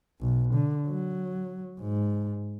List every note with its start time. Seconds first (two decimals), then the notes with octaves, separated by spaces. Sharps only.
0.21 B1
0.54 D3
0.88 F#3
1.80 G#2